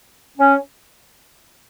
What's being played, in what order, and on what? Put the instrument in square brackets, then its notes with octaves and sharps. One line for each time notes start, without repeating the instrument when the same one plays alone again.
[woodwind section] C#4